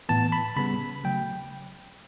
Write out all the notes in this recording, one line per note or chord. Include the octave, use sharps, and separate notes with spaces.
A2 E3 B3 A5
B5
C#3 G3 B3 B5
C#3 F#3 A3 G5